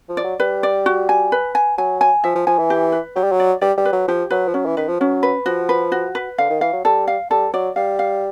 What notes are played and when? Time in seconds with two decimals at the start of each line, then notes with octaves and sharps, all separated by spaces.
0.09 F3
0.17 D5
0.24 F#3
0.40 G3 B4
0.63 D5
0.86 F#4
1.09 G#5
1.32 B4
1.55 G#5
1.78 F#3 G#5
2.01 G#5
2.24 F3 E5
2.35 F3
2.47 F3 G#5
2.58 E3
2.70 G4
2.92 B4
3.16 F#3 G4
3.24 G3
3.32 F#3
3.40 D5
3.61 G3 D5
3.77 G3
3.85 B4
3.93 F#3
4.08 F3 G4
4.30 F#3 B4
4.48 F3
4.54 F#3 C#4
4.66 E3
4.77 D#3 B4
4.88 F3
5.00 F#3 C#4
5.23 B4
5.46 F3 F#4
5.69 B4
5.92 F#4
6.15 B4
6.38 D3 F5
6.50 D#3
6.61 E3 F5
6.73 F#3
6.84 G3 A4
7.08 F5
7.30 G3 A4
7.53 F#3 D5
7.76 G3 F5
7.99 F5